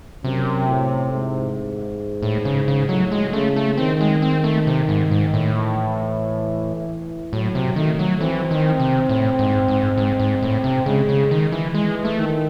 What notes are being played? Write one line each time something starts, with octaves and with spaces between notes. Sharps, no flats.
F#2 C3
A2
G#2
A2
C#3
C#3
A2 F#3
G#3
C#3 A3
A3
D#3 C4
G#3
C4
A3
C3
G#2
G#2
A2
E3
A2 F#3
C3
D#3 A3
F#3
E3 C4
D#3
C3
A2
G#2
G#2
G#2
G#2
A2
C3
C#3 G#3
C#3
D#3
E3
E3 G#3
A3
D#3